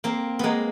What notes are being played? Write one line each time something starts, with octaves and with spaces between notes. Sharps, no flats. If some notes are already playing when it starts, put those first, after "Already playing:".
A#3 C4
G#3 A#3 B3